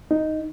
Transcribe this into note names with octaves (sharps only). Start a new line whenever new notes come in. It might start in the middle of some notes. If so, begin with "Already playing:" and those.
D#4